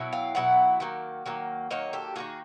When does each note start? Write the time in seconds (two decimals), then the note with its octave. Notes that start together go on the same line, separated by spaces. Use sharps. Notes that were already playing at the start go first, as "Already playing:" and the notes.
Already playing: B2 F#3 E4
0.13 F5 G5
0.35 B2 F#3 E4 F#5
0.80 D#3 F#3 A#3
1.26 D#3 F#3 A#3
1.71 D#3 F#3 A#3 C#5 D#5
1.93 G4 A4
2.16 D#3 F#3 A#3 F#4 G#4